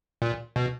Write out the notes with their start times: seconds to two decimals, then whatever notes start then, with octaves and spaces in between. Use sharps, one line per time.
0.22 A#2
0.56 B2